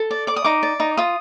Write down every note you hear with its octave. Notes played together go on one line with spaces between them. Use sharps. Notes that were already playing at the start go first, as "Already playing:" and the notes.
Already playing: A4
D5
D5 D6
D#6
D#4 D6
D5
D#4
F4 D#6